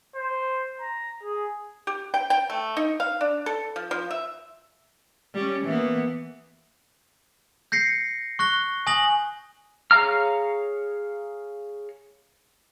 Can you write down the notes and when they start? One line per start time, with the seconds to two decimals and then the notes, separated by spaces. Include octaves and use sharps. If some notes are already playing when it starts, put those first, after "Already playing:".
0.15 C5
0.81 A#5
1.23 G#4
1.87 G4
2.14 G5
2.30 G5
2.50 A3
2.77 D#4
3.00 F5
3.21 D4
3.46 A4
3.76 F3
3.91 F3
4.10 E5
5.34 G3 C#4
5.65 E3 A#3 B3
7.72 G6 A#6 C7 C#7
8.39 C#6 F#6 A#6 G7
8.87 G#5 D#6 A#6 F#7
9.91 G#4 C#5 F5 A#5 F6